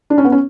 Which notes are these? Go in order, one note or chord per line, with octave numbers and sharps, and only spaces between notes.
D4
C#4
B3
C#4